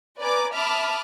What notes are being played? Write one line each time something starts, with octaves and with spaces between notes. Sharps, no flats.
B4 D5 G#5 A#5 D6
E5 A5 B5 D6 D#6 F6